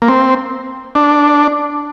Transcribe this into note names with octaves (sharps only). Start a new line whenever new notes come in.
A#3
C4
D4